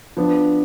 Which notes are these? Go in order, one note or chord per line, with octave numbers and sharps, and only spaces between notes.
F3 B3 D4